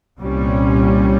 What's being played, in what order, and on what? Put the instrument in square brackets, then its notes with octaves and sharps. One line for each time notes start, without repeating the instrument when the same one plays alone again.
[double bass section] C2 A#2 G3 C#4